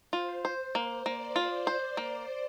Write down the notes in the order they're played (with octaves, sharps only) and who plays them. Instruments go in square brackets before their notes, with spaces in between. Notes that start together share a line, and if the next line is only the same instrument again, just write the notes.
[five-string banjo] F4 [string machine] C5
[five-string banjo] C5
A#3
[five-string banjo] A#3 [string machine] D5
[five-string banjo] F4
[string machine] C5
[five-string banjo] C5
A#3